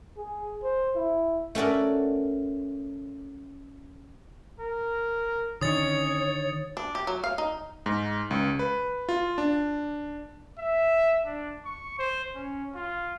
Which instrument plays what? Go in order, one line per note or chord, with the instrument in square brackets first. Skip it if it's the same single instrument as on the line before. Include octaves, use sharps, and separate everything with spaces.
[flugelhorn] G#4
C5
E4
[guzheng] A3 C#4 F#4 A4 A#4 D5
[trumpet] A#4
[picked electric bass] D3 D#3 [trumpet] C#4 [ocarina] C#5 [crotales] D#6 A6
[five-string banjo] D4
G4
F#3
F5
D#4
[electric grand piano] G#2
C#2
B4
F4
D4
[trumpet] E5
D4
C#6
C5
C#4
F4